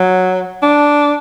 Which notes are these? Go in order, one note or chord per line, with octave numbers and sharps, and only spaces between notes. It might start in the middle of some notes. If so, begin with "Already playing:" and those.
Already playing: F#3
D4